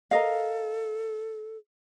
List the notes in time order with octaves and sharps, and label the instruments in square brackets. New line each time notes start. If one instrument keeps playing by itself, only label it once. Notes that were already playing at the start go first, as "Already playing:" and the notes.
[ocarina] A4 [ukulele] A#4 D#5 F5